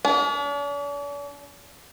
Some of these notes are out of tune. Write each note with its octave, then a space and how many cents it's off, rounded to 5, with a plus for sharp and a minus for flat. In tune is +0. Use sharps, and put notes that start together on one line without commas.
D4 -45